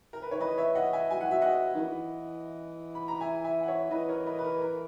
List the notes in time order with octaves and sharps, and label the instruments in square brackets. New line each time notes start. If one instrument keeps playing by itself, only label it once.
[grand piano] A#4
B4
[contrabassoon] D#3 [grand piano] C#5
[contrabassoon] E3 [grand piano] B4 D#5
[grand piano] C#5 E5
D#5 F#5
E5 G#5
[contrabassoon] F#3 [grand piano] G#5
[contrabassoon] E3 [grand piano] F#5
[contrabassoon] F#3 [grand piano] E5
[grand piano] D#5 F#5
[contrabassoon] D#3
E3
[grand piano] B5
A#5
E5 G#5
E5 G#5
F#5
C#5 E5
[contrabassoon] E3 [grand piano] B4 D#5
[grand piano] A#4 C#5
B4 D#5
B4
A#4
A#4